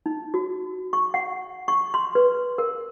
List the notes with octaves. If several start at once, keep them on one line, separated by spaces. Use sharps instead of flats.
D#4
F#4
C#6
F#5
C#6
C6
B4
A#4